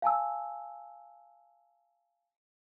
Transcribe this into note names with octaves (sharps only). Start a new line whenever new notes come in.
F5 G#5 A5 E6